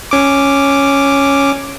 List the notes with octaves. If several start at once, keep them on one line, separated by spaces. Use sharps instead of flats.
C#4 D6